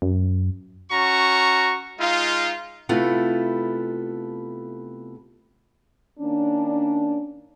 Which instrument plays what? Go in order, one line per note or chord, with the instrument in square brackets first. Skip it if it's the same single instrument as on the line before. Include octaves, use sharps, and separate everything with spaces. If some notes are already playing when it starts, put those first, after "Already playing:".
[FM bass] F#2
[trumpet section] C#4 F#4 A#5 C#6
G#3 D#4 F4
[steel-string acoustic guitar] C3 A3 B3 E4 F4 A4
[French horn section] D#3 A#3 C#4 D4